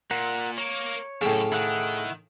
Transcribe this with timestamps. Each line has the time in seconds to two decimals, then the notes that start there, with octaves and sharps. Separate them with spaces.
0.11 A#2 A#4 F#5
0.58 A#3 A#4 C#5
1.22 F#2 A2 C#3
1.52 D#3 E4 F#5